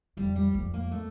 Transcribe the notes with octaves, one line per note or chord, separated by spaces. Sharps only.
F2 G3
G3
F2
A#3
A3